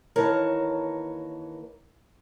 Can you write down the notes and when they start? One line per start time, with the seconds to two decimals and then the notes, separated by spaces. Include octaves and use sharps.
0.16 D#2 E3 A#4 C#5 A5 A#5